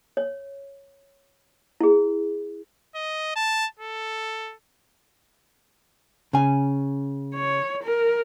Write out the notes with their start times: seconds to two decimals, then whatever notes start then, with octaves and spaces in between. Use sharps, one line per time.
0.17 C#5
1.81 E4 G#4
2.95 D#5
3.36 A5
3.79 A4
6.33 C#3 G#5
7.35 C#5
7.84 A#4